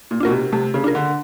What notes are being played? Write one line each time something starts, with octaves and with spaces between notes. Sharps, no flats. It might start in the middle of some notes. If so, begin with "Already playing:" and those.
A#2
B2 D4 F4 A#4
C3
C3 A3
C#3
D4 F4 A#4
D3